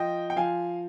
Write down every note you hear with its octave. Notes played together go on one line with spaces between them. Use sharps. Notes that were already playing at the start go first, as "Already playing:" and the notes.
Already playing: F3 D#5 G5
G5
F3 F5 G#5